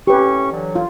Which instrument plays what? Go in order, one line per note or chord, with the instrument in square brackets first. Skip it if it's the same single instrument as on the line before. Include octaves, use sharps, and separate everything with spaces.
[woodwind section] A2 C#4 C#6 [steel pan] G4 B4
[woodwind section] D3 E3 F#3
[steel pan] F4